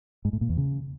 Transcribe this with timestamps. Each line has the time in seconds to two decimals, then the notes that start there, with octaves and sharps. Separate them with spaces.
0.25 G#2
0.33 A2
0.41 A#2
0.49 E2
0.58 C#3